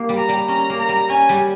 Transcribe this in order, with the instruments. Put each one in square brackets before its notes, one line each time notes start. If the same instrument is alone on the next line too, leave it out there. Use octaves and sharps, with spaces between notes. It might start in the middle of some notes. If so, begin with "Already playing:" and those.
Already playing: [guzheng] A#3 G4
G3
[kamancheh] A#5
[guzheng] G3
[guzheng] C#4 [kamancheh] A#5
[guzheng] A#3
[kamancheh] A#5
[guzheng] G3
[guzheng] C#4 [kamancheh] G#5
[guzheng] G3